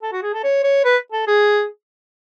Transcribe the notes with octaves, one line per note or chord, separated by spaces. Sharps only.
A4
F#4
G#4
A4
C#5
C#5
B4
A4
G#4